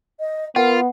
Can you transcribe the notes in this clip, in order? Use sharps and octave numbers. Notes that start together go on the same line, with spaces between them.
D#5
B3 F4 A#4 F#5